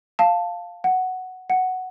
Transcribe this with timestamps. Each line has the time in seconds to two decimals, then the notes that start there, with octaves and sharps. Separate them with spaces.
0.19 F5 A5
0.84 F#5
1.50 F#5